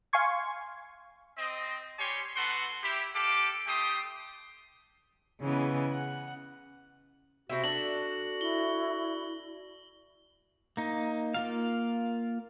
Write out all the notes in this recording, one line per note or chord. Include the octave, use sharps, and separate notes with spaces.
F5 G#5 C6 C#6 G#6
C4 D#5
G3 G4 C#5 G#5 C6
B3 F#4 A4 F#5 C6
E4 G4
G4 A4 F5 D6
A3 G4 G5 C6 D#6
C#3 E3 G#3 B3
F#5
C3 C4 E4 F#4
D4 A4 F#7
E4 G7
A#3 D#4
A#3 F4 F5